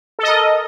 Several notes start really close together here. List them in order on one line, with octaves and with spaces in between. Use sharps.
A4 D#5 A#4